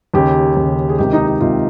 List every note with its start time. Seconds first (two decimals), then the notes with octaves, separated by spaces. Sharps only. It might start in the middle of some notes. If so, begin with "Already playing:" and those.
0.14 D#2 C#3 G4
0.56 D#2 C#3
0.89 G#4
0.98 C#2 C3 D#3 G4
1.13 D#4
1.27 D#4
1.40 C#2 C3 D#3 F4